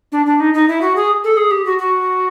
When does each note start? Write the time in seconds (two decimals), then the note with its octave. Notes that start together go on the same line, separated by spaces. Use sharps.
0.12 D4
0.26 D4
0.40 D#4
0.54 D#4
0.68 E4
0.81 F#4
0.96 G#4
1.24 A4
1.37 G#4
1.51 G4
1.66 F#4
1.78 F#4